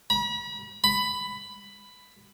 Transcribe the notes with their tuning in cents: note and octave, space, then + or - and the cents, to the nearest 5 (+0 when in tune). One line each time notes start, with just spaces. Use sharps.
B5 -40
B5 +10